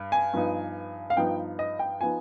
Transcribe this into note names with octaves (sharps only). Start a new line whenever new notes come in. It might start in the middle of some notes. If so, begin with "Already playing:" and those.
Already playing: G2
G#5
G2 F3 B3 D#4
F5
G2 F3 B3 D#4 G5
D#5
G5
F3 B3 D#4 G#5